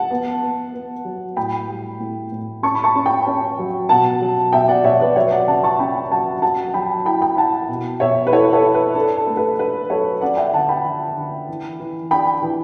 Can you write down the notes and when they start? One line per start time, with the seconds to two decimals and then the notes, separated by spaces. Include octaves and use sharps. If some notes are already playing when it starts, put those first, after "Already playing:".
Already playing: F#5 A5
0.11 B3
0.43 B3
0.74 B3
1.05 F#3
1.37 A2 G5 B5
1.68 G3
2.00 A2
2.32 A2
2.63 C#4 A5 C#6
2.75 B5
2.84 A5 C#6
2.96 C#4
3.06 G5 B5
3.27 C#4
3.59 F#3
3.89 B2 F#5 A5
4.21 F#3
4.53 B2 E5 G5
4.68 D5 F#5
4.84 B2 C#5 E5
5.00 B4 D5
5.16 F#3 C#5 E5
5.32 D5 F#5
5.48 C#3 F#5 A5
5.64 A5 C#6
5.79 C#4 G5 B5
6.11 F#3 F#5 A5
6.42 F#3 F#5 A5
6.74 F#3 G5 B5
7.05 E4 G5 B5
7.21 G5 B5
7.37 E4 F#5 A5
7.68 B2
8.00 B2 C#5 E5
8.27 B4
8.32 E4 A4 C#5
8.53 A4 C#5
8.63 E4
8.75 B4
8.95 D4 A4
9.16 A4
9.27 A3
9.37 B4
9.59 D4 B4
9.90 F#3 A4 C#5
10.21 C#4 D5 F#5
10.37 E5 G5
10.54 D3 F#5 A5
10.69 G5 B5
10.85 D3
11.17 D3
11.49 E3
11.80 E3
12.11 D4 G5 B5
12.43 E3